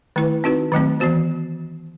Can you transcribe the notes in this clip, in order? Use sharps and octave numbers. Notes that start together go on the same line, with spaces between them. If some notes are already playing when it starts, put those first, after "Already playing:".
D#3 A3 E4 B4
C4 D#4 F#4 B4
D#3 F#3 A3 C4
E3 B3 F#4 C5